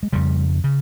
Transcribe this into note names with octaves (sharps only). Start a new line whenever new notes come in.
G#3
F2 C#3 G3
C#3